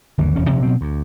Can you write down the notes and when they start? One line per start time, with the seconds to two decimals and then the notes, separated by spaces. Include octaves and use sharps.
0.18 G1 D#2 D3 E3
0.36 E1 E2 C#4
0.48 A#1 C3 F3 C4
0.63 B2 F#3 C4
0.81 D2